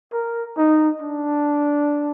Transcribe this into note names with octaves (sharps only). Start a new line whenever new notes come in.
A#4
D#4
D4